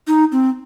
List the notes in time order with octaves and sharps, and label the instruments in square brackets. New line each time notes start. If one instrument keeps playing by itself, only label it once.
[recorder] D#4
C4